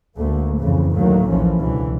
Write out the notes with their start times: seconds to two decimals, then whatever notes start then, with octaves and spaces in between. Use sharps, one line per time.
0.18 D2 G#2 D3 A3 A#3
0.59 F2 A2 C#3 E3
0.94 D2 A2 D#3 F#3 A3 A#3
1.29 A#1 D#2 E3 F3 C#4
1.60 C#2 B2 D3 E3